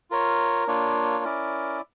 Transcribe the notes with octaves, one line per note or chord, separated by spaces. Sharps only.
F4 A#4 C#5
A#3 D4 F4 C#5
C#4 E4 A#4 D5